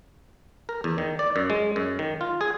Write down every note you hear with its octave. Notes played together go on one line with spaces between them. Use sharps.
A#4
E2
D#3
D5
F#2
G#3
F#2
D#3
F4
G#4